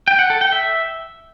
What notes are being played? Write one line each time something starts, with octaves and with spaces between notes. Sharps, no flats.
G5
F#5
A4
G5
E5